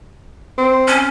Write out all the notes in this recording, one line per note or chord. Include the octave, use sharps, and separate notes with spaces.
C4
C#4